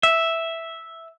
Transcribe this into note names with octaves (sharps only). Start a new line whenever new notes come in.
E5